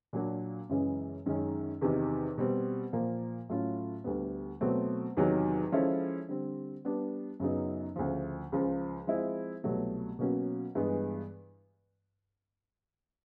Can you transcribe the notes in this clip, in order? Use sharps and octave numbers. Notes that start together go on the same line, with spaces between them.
A#2 F#3 A#3 D4 F#4
F#2 C#3 E3 G#3 C#4
F#2 D#3 G#3 C#4
E2 C3 D#3
B2 G3 C4
A#2 F3 A#3
A2 F#3 A3 C#4 F4
D2 D3 G3 B3
B2 F#3 A3 C4
E2 C3 D#3 F#3
F3 G#3 C#4 E4 A4
D3 G3 C4
G3 B3 D4
F#2 C#3 F#3 B3 D#4
D2 C#3 F3
C#2 C#3 F3
F3 G#3 C4 E4
C2 B2 F#3 A3
B2 F#3 A#3 C#4 F#4
G2 E3 G#3 B3